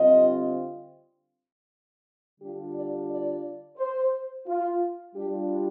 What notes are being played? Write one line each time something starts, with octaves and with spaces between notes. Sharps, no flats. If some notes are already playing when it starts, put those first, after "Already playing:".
Already playing: D3 G3 C4 F4 D#5
D3 G3 D4 F4 G4
D5
D5
C5
F4
G3 D4 F4 G4